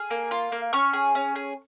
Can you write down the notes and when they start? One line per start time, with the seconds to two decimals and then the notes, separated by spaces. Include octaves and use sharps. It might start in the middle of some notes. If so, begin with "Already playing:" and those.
Already playing: G#4 F6
0.11 A#3
0.31 F4
0.52 A#3
0.73 C#4 C#6 F6
0.93 G#4
1.15 C#4
1.36 G#4